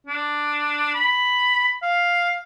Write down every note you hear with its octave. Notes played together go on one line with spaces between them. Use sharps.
D4
B5
F5